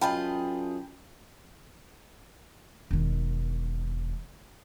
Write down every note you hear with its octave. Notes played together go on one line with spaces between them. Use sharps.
F#2 F4 G#4 D#5 G5 A5 B5
E1 D#3